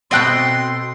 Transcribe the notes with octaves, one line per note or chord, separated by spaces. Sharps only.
B2 C4 A4 D#5 G5 C6 F#6